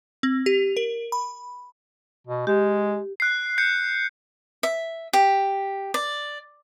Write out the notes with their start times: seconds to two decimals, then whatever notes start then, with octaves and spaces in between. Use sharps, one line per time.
0.23 C4
0.46 G4
0.77 A#4
1.12 B5
2.27 B2
2.47 G#3 G4
3.20 F#6 C7
3.58 G6 C7 C#7
4.63 E5
5.13 G4
5.94 D5